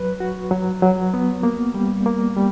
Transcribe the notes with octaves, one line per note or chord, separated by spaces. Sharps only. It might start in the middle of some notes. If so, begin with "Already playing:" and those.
Already playing: F#3 B4
F#4
F#3
F#3
B3
A#3
G3
A#3
G3